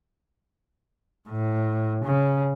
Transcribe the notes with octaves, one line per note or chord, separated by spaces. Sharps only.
A2
C#3